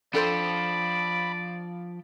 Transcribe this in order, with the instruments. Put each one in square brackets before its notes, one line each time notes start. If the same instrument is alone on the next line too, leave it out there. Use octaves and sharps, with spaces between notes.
[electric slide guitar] F3 G5 [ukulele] D4 A4 C5 [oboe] D5 [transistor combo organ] B5